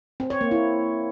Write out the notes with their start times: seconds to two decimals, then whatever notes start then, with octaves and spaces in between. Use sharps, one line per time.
0.20 C4
0.30 C#5
0.41 A#3
0.51 E4